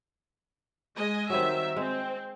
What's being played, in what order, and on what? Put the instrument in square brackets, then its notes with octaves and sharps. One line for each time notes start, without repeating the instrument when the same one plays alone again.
[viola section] G#3 D#5 G#5
[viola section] D#3 E5 [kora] F#3 G3 C4
[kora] G#3 [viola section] C4